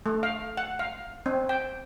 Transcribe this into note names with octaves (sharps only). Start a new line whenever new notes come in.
A3
F5
F#5
F5
C4
G5